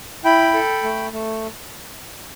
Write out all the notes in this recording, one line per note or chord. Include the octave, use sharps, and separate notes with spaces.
E4 G5 B5
A4
A3
A3